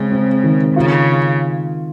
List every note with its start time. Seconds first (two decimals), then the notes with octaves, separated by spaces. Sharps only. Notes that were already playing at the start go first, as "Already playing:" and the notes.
Already playing: C#3 G#3 C4
0.12 C4
0.44 D#3
0.76 C#3 F4